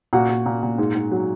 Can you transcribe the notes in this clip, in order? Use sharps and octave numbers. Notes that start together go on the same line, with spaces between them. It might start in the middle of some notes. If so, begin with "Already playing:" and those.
A#2 F#4 F#5
A#2
A#2
A#2
G#2
G#2
F#3